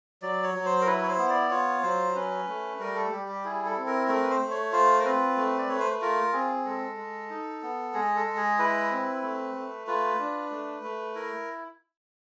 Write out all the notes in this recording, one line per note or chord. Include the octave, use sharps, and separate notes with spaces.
F#3 D5
C#5
F#3
C5
A#4
E4 B4
C#5
C5
B3
D5
F4 C#5
F#3 C5
C#4 B4
A3
G3 A#4
A4
G3 G4
G4
E4 G#4
A4
C4
A#4
A3 A#4
B4
C5
A3
C#5
F4 C5
A#4
C4 B4
A3
D5
A3 C#5
C5
B4
F4 A#4
C4 G#4
G#3 A4
G#3
D#4
B3
G#3 G#4
A4
G#3
G#4
E4 B4
C4
A3
A3
F4 B4
D4
A3
A3
E4 A#4